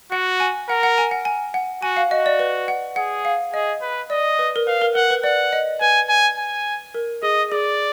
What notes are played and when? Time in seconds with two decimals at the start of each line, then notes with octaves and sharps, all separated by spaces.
0.12 F#4 F#5
0.40 G#5
0.69 A#4 F#5
0.83 F#5
0.98 G#5
1.11 F#5
1.25 G#5
1.54 F#5
1.83 F#4 G#5
1.97 F5
2.11 F#4 D#5
2.26 D5
2.39 B4
2.68 F#5
2.96 G#4 F#5
3.25 F5
3.53 G#4 D#5
3.82 B4
4.10 D5 D#5
4.39 B4
4.56 A#4
4.67 B4 F5
4.81 A#4
4.95 A#4 F#5
5.10 B4
5.24 D5 F#5
5.53 D#5
5.81 B4 G#5
6.09 G#5
6.38 G#5
6.95 A#4
7.23 G#4 D#5
7.52 G#4 D5